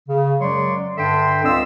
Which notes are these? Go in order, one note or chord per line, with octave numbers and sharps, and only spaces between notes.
C#3
F#2 F#3 G#3 C#5 D5 C6
G2 D3 D4 E5 G5 C6
C#2 C4 D5 D#5 F5 E6